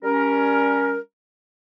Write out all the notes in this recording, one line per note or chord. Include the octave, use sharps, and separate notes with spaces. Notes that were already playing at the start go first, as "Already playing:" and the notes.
G3 C#4 A#4